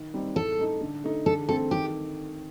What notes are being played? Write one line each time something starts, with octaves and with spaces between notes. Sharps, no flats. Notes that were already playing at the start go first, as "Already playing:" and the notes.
Already playing: D#3
G3 C4 D#4
A2 A4
A3 D#4
D3
A3 D#4
D3 A4
A3 C4 A4
D#3 G4